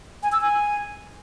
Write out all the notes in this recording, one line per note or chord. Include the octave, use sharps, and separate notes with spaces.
G#5
E6
G#5